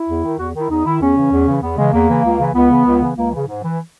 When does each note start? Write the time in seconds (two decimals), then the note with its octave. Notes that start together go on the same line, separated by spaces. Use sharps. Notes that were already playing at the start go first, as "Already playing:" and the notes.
Already playing: E4
0.09 E2
0.24 D#3
0.39 E2 F#4
0.55 D#3 E4
0.71 E2 D#4
0.85 D#3 E4
1.01 E2 C#4
1.16 C#3 E3
1.31 E2
1.47 C#3 E3
1.62 E2 B3
1.77 C#3 E3 G#3
1.93 E2 A#3
2.09 C#3 E3
2.24 C#2
2.39 C#3 E3
2.54 C#2 B3
2.70 C#3 E3
2.86 C#2
3.01 C#3 E3
3.16 C#2 A#3
3.31 C#3 E3
3.47 G#2
3.63 E3